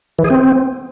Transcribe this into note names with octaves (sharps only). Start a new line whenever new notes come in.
E3
G#4
C4